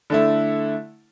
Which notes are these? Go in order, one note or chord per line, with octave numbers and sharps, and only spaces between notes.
D3 A3 E4